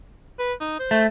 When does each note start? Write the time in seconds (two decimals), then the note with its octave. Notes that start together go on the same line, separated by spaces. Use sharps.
0.39 B4
0.61 D#4
0.79 C5
0.91 A3